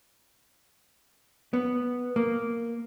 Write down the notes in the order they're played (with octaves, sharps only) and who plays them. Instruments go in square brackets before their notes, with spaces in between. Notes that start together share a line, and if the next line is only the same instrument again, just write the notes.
[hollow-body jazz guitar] B3
A#3